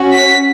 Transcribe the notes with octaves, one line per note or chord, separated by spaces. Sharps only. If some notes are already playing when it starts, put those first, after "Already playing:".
Already playing: C#4 F#4
B6